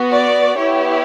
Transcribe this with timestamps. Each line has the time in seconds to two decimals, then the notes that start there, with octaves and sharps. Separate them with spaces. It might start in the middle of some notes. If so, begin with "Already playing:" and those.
Already playing: B3 F#4
0.11 D5
0.56 B3 E4 G4 C#5